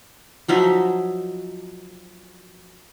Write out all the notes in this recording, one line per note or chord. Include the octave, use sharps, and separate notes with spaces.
F3 F#3 D#4 E5